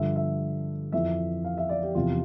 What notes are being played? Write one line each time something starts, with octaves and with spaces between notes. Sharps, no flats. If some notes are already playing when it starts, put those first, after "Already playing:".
Already playing: G2 D3 F3 E5
E5
F2 E3 E5
F5
E5
D5
G4
E2 C3 F3 F4